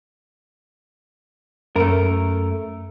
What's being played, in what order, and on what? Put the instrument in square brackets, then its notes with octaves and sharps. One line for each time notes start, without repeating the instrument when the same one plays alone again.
[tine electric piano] F#2 [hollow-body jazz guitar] A3 A#4